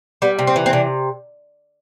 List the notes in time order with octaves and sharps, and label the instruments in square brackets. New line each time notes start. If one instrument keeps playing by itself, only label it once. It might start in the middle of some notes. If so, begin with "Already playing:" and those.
[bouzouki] G3 B3
C3
C4
E3
C4
C3 D4